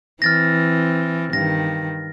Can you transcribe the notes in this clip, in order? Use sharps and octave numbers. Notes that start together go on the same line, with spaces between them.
E3 C4 F6 A6 A#6
G2 D#3 A#6